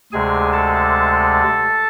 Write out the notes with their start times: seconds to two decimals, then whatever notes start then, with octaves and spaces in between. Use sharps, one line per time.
0.12 D2 C3 G#3 G#4 G#5
0.53 A4 A5